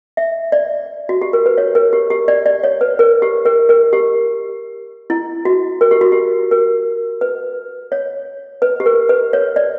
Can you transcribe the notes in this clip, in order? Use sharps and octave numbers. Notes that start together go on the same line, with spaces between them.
E5
D5
F#4
G4
A#4
B4
C#5
A#4
G4
G4
D5
D5
C#5
B4
A#4
G4
A#4
A#4
G4
E4
F#4
A#4
G4
F#4
G4
A#4
B4
C#5
B4
G4
A#4
B4
C#5
D5